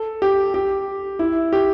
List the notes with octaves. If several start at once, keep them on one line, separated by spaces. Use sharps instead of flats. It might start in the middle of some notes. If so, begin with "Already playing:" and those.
Already playing: A4
G4
G4
E4
G4